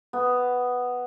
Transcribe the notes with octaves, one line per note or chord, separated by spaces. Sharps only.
B3